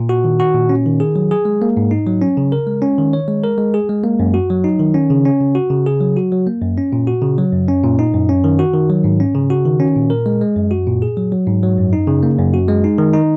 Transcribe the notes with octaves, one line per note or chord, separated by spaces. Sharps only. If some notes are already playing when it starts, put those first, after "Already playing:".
Already playing: A#2
F#4
D#3
F#4
A#2
C#4
D#3
G#4
F#3
G#4
G#3
A#3
G#2
D#4
F#3
C#4
C#3
A#4
G#3
C#4
D#3
C#5
G#3
A#4
G#3
G#4
G#3
A#3
F#2
F#4
F#3
D#4
D#3
C#4
C#3
C#4
C#3
F#4
C#3
G#4
F#3
F#4
F#3
A#3
F#2
C#4
A#2
F#4
C#3
F#3
F#2
C#4
A#2
D#4
F#2
C#4
D#3
F#4
D#3
F#3
G#2
C#4
C#3
F#4
D#3
C#4
A#2
A#4
G#3
G#3
F#2
F#4
A#2
G#4
F#3
F#3
G#2
F#3
F#2
D#4
C#3
A#3
F#2
F#4
G#3
D#4
D#3
D#4